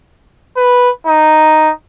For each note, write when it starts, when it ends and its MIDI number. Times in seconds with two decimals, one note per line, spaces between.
0.57 0.89 71
1.06 1.71 63